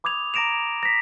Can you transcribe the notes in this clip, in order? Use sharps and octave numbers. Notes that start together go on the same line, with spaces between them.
B5 D6 D#6 G#6 F7
A#5 D6 A#6 D7 E7 F7
A#6 B6